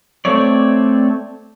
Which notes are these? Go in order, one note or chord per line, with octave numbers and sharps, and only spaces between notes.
A3 C4 C#5 D5